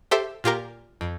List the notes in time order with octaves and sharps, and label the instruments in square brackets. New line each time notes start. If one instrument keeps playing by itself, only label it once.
[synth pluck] G4 A4 C5 E5
A#2 F4 G4 A#4
F2